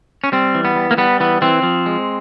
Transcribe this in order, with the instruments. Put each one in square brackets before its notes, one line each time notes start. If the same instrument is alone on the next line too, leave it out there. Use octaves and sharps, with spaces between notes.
[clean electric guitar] C#4
G3 C4
E3
B3
G3
A#3
G3 B3
E3 B3
E3 C4
F3
G#3